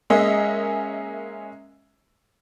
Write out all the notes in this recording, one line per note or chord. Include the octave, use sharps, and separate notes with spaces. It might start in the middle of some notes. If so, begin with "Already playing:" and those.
G#3 A#3 C#4 D#5 E5